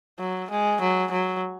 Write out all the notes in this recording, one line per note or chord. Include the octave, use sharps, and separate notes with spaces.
F#3
G#3
F#3
F#3